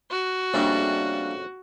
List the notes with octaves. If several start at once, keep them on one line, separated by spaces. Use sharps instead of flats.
F#4
F2 C#3 G3 A3 A#3 D4